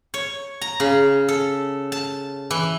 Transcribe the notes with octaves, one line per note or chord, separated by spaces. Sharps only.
C#5
A#5
C#3
A4
A5
E3